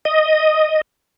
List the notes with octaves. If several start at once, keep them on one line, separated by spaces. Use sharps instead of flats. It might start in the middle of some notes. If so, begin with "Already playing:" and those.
D#5